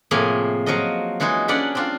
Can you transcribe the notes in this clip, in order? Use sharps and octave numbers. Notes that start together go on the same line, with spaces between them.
A2 C3 F3 A#3 G#4 G#5
F3 F#3 F#4 A#4 D#5
E3 G#3 D#4 F#4 G#4
C#4 D4 B4 D5 F#5
C4 D4 F4